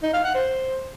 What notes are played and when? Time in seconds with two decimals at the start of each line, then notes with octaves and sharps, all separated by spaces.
0.03 D#4
0.13 F5
0.24 F#5
0.35 C5